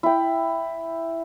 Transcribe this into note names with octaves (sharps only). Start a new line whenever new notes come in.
E4 G5